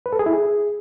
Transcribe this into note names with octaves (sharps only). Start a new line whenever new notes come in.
B4
A4
G#4
E4
G#4